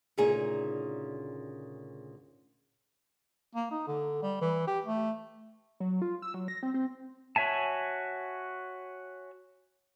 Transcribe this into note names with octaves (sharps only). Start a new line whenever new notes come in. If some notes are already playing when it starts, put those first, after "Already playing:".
D2 A#2 C#3 D#4 G#4
A#3
D#4
D3
G3
E3
G4
A3
F#3
F4
E6
F#3
A#6
C4
C4
F#4 C#5 E5 G#5 A5